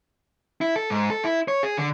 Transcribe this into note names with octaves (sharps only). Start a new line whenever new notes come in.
E4
A4
G#2
A4
E4
C#5
G#4
D3